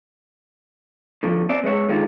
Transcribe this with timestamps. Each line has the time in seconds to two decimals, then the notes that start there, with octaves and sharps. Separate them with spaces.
1.23 A2 D3 F3
1.49 C4 D5 E5
1.64 G#3 B4 C#5 E5
1.89 D3 D#3 G#3 F4